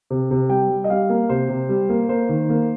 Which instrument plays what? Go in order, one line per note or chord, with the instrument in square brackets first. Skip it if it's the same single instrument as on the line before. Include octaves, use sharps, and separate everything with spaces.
[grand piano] C3
C3
G3 G5
G3
D#5
G3 F5
A#3
C3 C5
C3
G3
A#3
A#3 C5
D#3
A#3